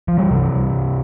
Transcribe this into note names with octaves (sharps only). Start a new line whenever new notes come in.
F3
E3 G3
C3 E3